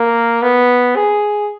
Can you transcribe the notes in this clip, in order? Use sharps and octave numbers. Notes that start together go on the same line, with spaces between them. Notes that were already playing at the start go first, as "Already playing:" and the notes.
Already playing: A#3
B3
G#4